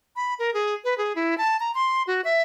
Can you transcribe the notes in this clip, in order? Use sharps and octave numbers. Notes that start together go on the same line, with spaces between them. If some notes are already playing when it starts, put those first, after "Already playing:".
B5
A#4
G#4
B4
G#4
E4
A5
A#5
C6
F#4
E5